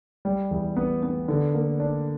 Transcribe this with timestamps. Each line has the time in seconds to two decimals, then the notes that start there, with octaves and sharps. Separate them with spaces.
0.25 G3
0.51 E2
0.76 B3
1.03 B3
1.28 D3
1.54 A#3
1.80 D4